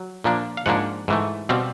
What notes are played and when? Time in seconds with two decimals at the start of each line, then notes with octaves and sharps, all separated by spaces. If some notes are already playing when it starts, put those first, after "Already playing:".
Already playing: F#3
0.24 A#2 F3 A#3 D4
0.57 F5
0.66 G#2 F3 A#3 D4 F#5
1.08 G#2 E3 A3
1.49 B2 G3 C4 F5